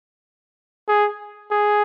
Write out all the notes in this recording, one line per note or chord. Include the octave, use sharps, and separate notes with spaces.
G#4
G#4